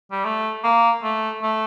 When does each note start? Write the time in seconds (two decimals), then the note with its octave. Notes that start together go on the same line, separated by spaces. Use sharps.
0.11 G3
0.24 A3
0.64 A#3
1.03 A3
1.42 A3